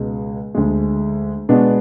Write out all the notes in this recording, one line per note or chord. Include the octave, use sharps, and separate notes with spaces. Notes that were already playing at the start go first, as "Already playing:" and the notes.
Already playing: C#2 B2 G#3
D2 D3 G#3
B2 G#3 B3 D4